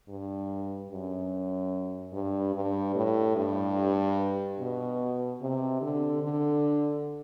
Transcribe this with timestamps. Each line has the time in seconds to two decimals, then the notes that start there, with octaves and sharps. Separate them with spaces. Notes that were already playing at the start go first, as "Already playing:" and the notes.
0.08 G2
0.90 F#2
2.13 G2
2.54 G2
2.95 A2
3.36 G2
4.60 B2
5.42 C3
5.81 D3
6.23 D3